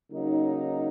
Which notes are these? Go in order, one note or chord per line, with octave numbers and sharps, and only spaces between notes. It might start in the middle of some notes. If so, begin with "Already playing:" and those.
C#3 F#3 A#3 D#4